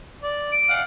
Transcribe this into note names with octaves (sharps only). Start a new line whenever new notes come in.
D5
D7
F5 F#5